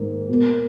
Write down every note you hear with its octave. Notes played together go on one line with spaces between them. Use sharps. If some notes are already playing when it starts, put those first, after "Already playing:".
Already playing: G#2 D#3 A#3
B2 A#3